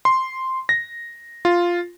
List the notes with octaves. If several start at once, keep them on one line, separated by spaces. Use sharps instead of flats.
C6
A#6
F4